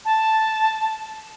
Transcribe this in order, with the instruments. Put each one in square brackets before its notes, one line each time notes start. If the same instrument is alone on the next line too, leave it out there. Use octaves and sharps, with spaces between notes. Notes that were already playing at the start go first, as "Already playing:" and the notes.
[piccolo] A5